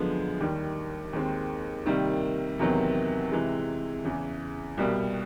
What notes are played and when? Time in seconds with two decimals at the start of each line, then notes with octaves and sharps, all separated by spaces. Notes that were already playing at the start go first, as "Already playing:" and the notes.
Already playing: F#2 D3 F3 G#3 B3
0.40 D#2 D#3 G3
1.13 D#2 D#3 G#3 C4
1.86 C3 D#3 G3 A#3
2.59 E2 C3 D#3 F#3 B3
3.32 C3 E3 G#3
4.05 E2 C#3 E3
4.78 C2 B2 G3 A#3